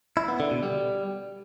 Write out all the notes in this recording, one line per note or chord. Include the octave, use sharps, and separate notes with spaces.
E4
B3
D3
B2
G3